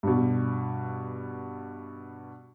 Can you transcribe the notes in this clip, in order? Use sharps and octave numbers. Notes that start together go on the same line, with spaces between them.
G2 B2